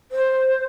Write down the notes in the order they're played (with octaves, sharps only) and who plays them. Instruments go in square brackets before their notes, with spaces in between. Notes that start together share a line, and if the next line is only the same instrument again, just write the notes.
[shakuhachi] C5